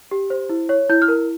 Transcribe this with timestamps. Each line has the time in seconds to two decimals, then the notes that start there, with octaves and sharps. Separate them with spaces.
0.11 G4
0.30 C5
0.49 E4
0.69 C#5
0.90 E4 G6
1.02 F6
1.08 A#4